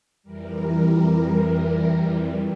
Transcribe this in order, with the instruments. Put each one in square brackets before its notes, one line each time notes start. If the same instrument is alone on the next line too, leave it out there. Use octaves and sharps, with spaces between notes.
[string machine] F2 E3 G3 A#4